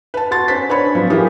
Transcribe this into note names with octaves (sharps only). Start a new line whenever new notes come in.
B4 A5
F#4 C6 A6
C#4 C5 B6
D4 B4 C#5 B5
F3 F#3 C4
E3 F3 G4 G#4 A#4